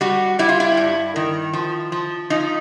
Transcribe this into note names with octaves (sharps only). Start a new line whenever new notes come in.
G3 F#4
G3 E4
F4
E4
G2
D#3
F3
F3
F3 D#4